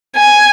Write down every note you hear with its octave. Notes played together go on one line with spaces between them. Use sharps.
G#5